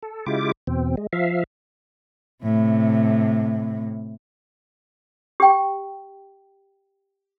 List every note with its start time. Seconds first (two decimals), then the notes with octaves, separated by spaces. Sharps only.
0.02 A4
0.26 C#3 G#3 E4 F4 G4 D6
0.67 E2 B2 C4
0.97 G#3
1.13 F3 E5 F5
2.43 A2 C3
5.40 G4 G5